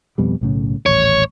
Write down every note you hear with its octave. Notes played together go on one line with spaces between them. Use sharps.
F2 B2 G3
B1 A2 C#3
D#1 A1 C#5